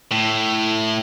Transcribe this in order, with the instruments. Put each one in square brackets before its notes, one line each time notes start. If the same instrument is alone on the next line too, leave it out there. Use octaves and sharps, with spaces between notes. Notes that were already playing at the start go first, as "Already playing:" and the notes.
[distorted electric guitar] A2